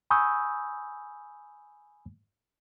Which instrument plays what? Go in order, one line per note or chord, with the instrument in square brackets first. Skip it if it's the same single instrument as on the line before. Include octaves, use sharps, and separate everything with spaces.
[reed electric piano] G#5 B5 C#6 D#6 E6 G6